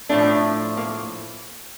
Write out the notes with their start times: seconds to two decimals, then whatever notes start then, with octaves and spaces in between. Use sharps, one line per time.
0.09 A2 F3 A3 D4
0.77 A#3